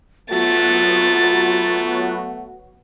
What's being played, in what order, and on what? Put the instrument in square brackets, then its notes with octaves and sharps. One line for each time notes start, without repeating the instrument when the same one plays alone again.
[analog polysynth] F#3 B3 F#4 [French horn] A3 [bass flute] F4 [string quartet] A6